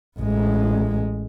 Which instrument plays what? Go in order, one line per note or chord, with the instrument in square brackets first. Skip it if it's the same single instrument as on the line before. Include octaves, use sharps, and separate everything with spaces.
[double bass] A1 G#3